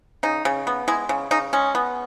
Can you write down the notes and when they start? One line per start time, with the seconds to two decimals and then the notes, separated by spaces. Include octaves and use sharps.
0.23 C#3 D#4
0.45 C#3
0.67 B3
0.88 G#3 E4
1.09 C#3
1.31 C#3 D#4
1.53 G#3 C#4
1.75 B3